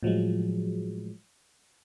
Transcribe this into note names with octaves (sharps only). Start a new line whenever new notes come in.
A2 F3 F#3 G#3